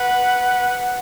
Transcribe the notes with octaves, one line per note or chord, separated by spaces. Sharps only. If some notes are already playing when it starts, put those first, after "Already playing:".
Already playing: B4 F#5